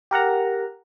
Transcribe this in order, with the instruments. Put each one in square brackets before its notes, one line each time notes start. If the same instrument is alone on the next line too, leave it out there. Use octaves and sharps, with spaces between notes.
[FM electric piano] G4 A#4 F#5 A#5